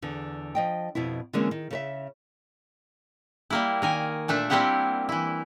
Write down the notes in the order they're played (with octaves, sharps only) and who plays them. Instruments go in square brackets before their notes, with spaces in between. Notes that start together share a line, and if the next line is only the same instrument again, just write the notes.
[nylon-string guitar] E2 D3
F3 D#5 G5
F2 B2 B3 E4
D3 E3 G#3 A#3 C4 C#4
D#3
C#3 A#4 E5
[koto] G3 A#3 E4
D#3 A#4 G#5
A#2 A3 D4 E5
G3 A#3 C4 E4 G4 F#5
E3 E4